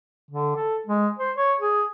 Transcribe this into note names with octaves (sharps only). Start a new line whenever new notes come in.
D3
A4
G#3
C5
C#5
G#4